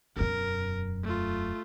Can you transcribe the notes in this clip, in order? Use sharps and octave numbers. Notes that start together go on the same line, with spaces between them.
E1 F#2 A#4
A3 F4